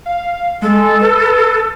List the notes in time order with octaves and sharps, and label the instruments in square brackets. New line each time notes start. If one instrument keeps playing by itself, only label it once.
[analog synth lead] F5
[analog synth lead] G#3 [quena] A4
[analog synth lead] B4